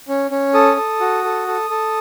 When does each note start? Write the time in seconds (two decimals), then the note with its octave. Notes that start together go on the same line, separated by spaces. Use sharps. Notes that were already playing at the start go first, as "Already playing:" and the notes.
0.08 C#4
0.31 C#4
0.54 A4 D#6
0.77 A4
1.00 F#4
1.24 A4
1.47 A4
1.70 A4